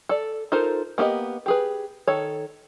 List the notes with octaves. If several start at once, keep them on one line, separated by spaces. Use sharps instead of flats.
A4 D5
D#4 F4 A4 A#4 C5
A#3 B3 G4 C#5 D#5
G4 G#4 B4
D#3 A4 C#5